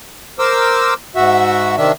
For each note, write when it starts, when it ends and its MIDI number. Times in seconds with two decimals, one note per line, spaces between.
0.39 0.94 70
0.39 0.94 72
0.39 0.94 86
0.39 0.94 88
1.16 1.76 44
1.16 1.76 66
1.16 1.76 76
1.77 1.92 48
1.77 1.92 51
1.77 1.92 62
1.77 1.92 76